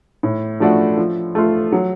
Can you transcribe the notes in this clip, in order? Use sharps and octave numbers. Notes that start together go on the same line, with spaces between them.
A2
F3 A3 D4 F#4
F3
A3 F4
F#3